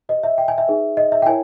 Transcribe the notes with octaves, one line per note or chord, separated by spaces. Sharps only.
G4 B4 D#5
E5
G5
G#5
E5
D#4 G#4 B4
D#5
E5
G5
E4 A#4 C#5 G#5